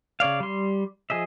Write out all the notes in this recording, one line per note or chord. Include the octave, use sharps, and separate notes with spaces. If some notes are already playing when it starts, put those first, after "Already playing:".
C#3 C#5 D5 F5
G3 C6
F3 G#4 D#5 E5